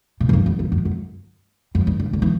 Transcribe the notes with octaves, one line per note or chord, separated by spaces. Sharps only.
B2
F#2
G2
E2
F#2
F#2
F#2
F#2
G2
D3
D3
E3